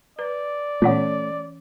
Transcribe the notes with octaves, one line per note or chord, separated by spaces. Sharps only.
B4 D5
A#2 E3 A3 B3 C#4 C#5